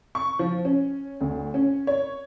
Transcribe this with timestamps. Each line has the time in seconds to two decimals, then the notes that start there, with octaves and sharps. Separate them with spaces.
0.15 C#6
0.39 F3
0.65 C#4
1.21 D2
1.54 C#4
1.87 C#5